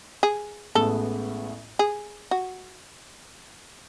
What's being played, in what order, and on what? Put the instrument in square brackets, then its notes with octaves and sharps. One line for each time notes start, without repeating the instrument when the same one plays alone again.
[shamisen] G#4
[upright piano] A1 A2 G#3 B3 [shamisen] A4
[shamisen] G#4
F#4